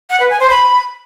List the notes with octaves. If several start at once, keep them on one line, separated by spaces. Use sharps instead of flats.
F#5
B4
G#5
C5
B5